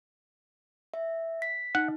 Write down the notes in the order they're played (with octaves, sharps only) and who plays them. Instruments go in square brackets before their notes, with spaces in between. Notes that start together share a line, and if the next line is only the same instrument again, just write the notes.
[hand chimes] E5
B6
[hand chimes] D#4 [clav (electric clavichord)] F#5